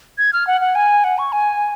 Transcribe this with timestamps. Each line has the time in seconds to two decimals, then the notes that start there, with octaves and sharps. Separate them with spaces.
0.18 G#6
0.33 F6
0.47 F#5
0.61 F#5
0.75 G#5
1.04 F#5
1.18 C#6
1.32 G#5